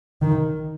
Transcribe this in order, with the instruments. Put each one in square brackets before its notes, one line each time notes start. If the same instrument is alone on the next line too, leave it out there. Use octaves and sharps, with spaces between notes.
[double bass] D#3